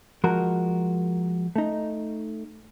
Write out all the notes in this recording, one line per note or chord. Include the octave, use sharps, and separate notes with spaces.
F3 G#3 F#4 A#4
A3 D#4